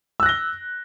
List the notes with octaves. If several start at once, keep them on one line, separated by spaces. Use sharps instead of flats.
E6 F#6 A#6 G7